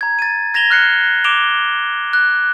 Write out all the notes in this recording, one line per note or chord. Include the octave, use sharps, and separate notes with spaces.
A#5 G#6
A6 D#7
G#6 A#6 E7 F7 G7
F6 F#6 C7 C#7
D6 D7 E7 F7 G7
F#6